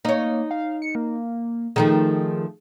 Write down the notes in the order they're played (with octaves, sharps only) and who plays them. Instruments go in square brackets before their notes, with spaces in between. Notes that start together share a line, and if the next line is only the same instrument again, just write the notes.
[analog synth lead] A#3 [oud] D#4 C#5
[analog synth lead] F5
C#7
A#3
[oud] D#3 F3 A3 [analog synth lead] G#4